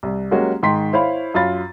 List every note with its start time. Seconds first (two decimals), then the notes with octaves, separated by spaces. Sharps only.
0.03 C2
0.31 F#3 G#3 A#3 C#4 F#4 G4
0.63 G#2 D#3 G5 C6 B6
0.93 E4 C5 C#5 F5 B5
1.34 F#2 F4 B5 A6